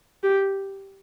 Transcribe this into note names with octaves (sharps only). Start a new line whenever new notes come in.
G4